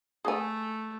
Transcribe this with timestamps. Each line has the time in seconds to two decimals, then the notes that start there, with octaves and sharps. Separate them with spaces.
0.25 A3 G#4 G#5